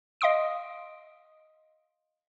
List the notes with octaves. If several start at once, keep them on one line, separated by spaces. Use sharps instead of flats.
D#5 F5 C6 D#6 D7